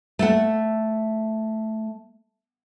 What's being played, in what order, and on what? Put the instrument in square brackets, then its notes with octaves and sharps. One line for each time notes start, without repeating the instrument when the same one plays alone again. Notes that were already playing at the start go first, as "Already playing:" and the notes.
[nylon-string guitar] A3 A4 F#5